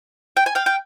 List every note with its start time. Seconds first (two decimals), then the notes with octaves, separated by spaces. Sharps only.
0.37 G5
0.46 G#5
0.55 F5 G5
0.66 G5